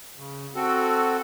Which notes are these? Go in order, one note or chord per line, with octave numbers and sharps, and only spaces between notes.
C#3
C4 F#4 A4